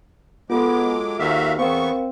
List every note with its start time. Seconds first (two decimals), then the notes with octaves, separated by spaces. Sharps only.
0.50 F#3 G#3 B3 F4 A4 D6
1.19 D#2 F#4 E5 F5
1.58 E2 B3 C4 A#4 F5 C#6